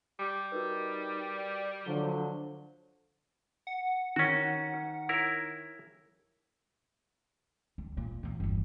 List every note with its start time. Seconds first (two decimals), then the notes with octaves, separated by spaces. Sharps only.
0.19 G3 G4
0.52 D#4 F#4 A#4 B4
1.34 D5
1.85 D3 F3 F#3 C5 G7
3.67 F#5
4.16 D#3 C#4 F#4
5.09 E4 A#4 C#5
7.78 D2
7.97 A#2
8.23 E2 A#2
8.40 G1 E2